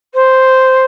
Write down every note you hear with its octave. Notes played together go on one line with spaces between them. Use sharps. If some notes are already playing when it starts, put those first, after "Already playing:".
C5